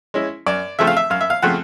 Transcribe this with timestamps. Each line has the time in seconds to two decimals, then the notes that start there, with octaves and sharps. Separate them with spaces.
0.14 G#3 C#4 E4
0.46 F#2 D5
0.79 C#3 F3 A3 C4 E5
0.87 F5
0.97 E5
1.10 F#2 F5
1.21 E5
1.30 F5
1.42 C#3 F3 A3 C4 F#5